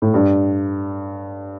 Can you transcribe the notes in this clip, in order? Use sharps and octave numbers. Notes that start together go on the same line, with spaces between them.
A2
G2